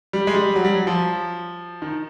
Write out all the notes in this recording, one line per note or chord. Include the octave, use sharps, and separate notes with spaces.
G3
G#3
G3
F#3
G3
F#3
F3
D#3